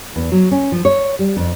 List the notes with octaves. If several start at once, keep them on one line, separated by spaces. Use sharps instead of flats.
E2
F#3
C#4
F3
C#5
G3
F2